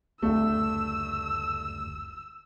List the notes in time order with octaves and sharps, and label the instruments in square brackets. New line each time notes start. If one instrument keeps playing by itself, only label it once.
[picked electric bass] F#1 D2 G2 [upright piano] A3 [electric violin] E6